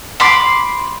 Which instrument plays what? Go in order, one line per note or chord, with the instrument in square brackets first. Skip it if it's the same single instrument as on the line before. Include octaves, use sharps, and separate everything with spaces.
[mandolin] B5 C6 D6